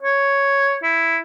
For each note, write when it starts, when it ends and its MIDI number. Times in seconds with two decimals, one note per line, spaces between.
0.02 0.76 73
0.83 1.18 64